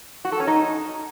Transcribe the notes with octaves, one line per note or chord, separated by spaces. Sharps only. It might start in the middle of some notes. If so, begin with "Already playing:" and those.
F#4
A4
C#4
D#4